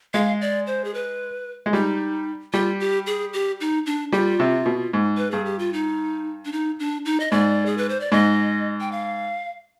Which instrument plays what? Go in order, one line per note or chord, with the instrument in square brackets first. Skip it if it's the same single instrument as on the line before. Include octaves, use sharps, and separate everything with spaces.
[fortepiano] G#3 [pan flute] F5
[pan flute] D5
C5
G#4
B4
[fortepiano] G#3
[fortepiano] G3 [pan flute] D#4
[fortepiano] G3 [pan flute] F4
[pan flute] G4
G#4
G4
D#4
D4
[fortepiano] G3 [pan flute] F4
[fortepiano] C3
B2
G#2
[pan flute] B4
[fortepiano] G2 [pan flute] G#4
[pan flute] G4
F4
D#4
D4
D#4
D4
D#4
D#5
[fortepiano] G#2 [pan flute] D5
[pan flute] G#4
B4
C5
D5
[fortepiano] G#2 [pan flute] D#5
[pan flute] G5
F5